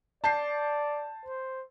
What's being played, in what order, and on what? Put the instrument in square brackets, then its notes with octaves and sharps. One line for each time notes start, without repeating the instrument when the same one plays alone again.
[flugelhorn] D5 [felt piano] A5 G6 C7
[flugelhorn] C5